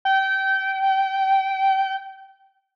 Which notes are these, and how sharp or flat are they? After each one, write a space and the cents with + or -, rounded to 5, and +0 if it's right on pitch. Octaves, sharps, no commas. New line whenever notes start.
G5 -25